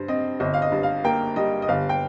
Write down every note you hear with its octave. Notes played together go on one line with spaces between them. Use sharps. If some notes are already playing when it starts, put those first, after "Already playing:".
Already playing: G2 C5
C4 D#5
G1 D#5
F5
D#5
G2
F5
A#3 G5
G3 D#5
D#5
G1 F5
G5